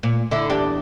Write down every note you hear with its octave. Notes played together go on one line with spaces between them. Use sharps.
A#2
D3 E4
E2 D4 G4